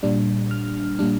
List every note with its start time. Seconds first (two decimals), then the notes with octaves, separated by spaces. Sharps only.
0.03 A#2 G3 D4
0.51 F6
0.99 A#2 G3 D4